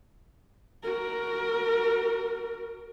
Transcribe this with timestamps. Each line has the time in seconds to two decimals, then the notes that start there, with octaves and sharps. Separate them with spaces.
0.83 F#4 A#4